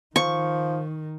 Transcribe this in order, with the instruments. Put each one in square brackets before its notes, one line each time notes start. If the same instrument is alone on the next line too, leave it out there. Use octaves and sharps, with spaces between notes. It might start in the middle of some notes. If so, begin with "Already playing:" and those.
[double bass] D#3 [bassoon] F3 [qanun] C#6